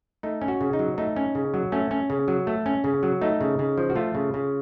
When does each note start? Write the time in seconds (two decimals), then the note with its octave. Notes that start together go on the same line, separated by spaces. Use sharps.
0.23 A3 D#4
0.42 C#4
0.48 F#4
0.61 C#3
0.73 D#4
0.79 F#3
0.98 A3 D#4
1.16 C#4
1.35 C#3
1.54 F#3
1.72 A3 C#4
1.91 C#4
2.10 C#3
2.28 F#3
2.47 A3
2.66 C#4
2.84 C#3
3.03 F#3
3.21 A3 D#4
3.41 C#3
3.59 C#3
3.78 F3
3.90 F#4
3.96 A3 F4
4.15 C#3
4.34 C#3